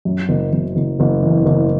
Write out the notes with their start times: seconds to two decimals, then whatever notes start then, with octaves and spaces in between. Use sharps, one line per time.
0.05 F#2
0.29 F#1
0.52 F#1
0.76 F#1
1.00 F#1
1.22 E3
1.46 F#1